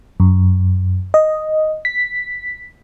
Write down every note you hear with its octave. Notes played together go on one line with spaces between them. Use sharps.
F#2
D#5
B6